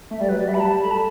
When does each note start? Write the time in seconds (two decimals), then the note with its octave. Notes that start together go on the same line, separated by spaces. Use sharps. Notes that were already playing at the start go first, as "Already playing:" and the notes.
0.11 A3 E5
0.20 G3 D5
0.29 F#3 B4
0.38 D5
0.48 G3 E5
0.54 B5
0.60 A5
0.82 A3 B5
0.91 A5